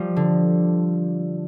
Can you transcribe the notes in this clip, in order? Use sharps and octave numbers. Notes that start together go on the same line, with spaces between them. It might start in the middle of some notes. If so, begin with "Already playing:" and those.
Already playing: F3 G3
D3